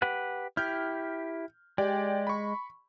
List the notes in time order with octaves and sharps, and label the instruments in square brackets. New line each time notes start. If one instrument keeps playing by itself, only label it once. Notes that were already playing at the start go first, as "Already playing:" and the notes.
[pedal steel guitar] G4 B4 F#5
[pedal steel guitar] E4 G4 [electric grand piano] F6 G6
[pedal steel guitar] G#3 [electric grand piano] G4 D5 G5
[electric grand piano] B5 C#6